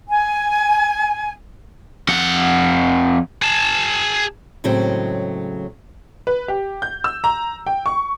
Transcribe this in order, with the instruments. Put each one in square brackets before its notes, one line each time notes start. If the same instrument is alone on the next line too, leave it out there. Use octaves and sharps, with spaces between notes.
[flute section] G#5
[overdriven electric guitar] F2 F#5
[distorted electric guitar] G#4 A5
[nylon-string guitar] A2 C#3 F#3 G#3 C4
[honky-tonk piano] B4
G4
G6
E6
A#5
G5
C#6